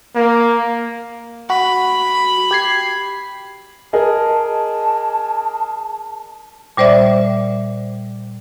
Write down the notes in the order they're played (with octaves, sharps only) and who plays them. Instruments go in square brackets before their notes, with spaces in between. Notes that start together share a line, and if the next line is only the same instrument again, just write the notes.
[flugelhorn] A#3
[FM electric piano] F#4 [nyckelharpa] B5
[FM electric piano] G4 G#6 C7
[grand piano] G#4 A#4 D#5 [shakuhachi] A5
[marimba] A#2 G3 C5 D5 E5